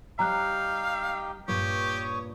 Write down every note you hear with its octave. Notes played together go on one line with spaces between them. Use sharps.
G3 D#4 G4 C#5 F5 G5 A#5 F#6
G2 A#2 G4 B4 C#5 C#6 D#6